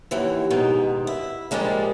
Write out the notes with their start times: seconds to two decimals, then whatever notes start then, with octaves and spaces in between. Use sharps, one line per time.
0.11 D#2 E3 F#3
0.50 G#2 B2 D#3
1.07 E4
1.51 A#2 F3 G3 G#3 A#3